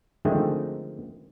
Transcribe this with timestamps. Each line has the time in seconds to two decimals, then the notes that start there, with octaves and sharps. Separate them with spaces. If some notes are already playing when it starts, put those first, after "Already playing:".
0.25 D3 D#3 F3 G#3 A3 C4